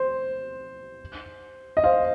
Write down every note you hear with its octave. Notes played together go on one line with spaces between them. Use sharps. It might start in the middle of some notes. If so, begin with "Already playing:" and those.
Already playing: C5
D#5
C5 F5